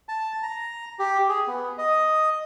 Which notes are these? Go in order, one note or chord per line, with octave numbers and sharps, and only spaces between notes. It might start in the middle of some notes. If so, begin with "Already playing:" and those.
A5
A#5
G4
G#4
B3
D#5